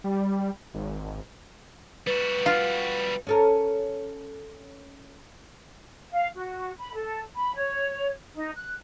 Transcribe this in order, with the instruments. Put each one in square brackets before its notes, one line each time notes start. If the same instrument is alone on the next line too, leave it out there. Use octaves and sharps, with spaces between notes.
[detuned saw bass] G3
G#1
[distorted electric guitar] G3 F#4 [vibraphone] B4
[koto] F4
[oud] C#4 A4 A#4
[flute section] F5
F#4
B5
A4
B5
C#5
D#4
F#6